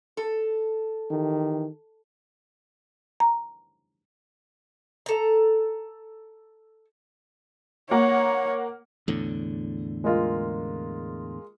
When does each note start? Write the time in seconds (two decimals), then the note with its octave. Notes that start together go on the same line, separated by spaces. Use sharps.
0.17 A4
1.11 D#3 E3 G4
3.20 A#5
5.06 A4 A#5
7.91 A#3 A#4 C#5 F#5
9.08 E2 A2 D3
10.04 G#3 A#3 F4